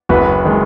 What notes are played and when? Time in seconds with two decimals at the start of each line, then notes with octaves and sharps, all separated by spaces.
0.09 F#1 F#4 B4
0.45 D#3 G#3